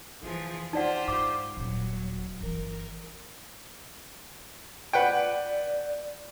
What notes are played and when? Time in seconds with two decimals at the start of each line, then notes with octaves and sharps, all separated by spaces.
0.23 F1 E3 F3 G#4
0.73 D#4 F4 G4 C5 D5 F#5
1.08 G#2 D6
1.57 D#1 F#3
2.40 G1 E3 A#4
4.93 B4 D5 F#5 G5